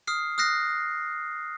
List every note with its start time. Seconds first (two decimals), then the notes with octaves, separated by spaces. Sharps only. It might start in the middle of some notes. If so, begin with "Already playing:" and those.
0.07 D#6 F6 C7
0.38 D#6 F6 F#6 A#6 C7